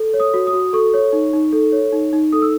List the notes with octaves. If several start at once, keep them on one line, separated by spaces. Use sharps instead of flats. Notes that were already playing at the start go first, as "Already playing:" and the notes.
Already playing: A4
C#5
D#6
F#4
D#6
F#4
A4 C#6
C#5
D#4
D#4
A4
C#5
D#4
D#4
A4 D#6
E6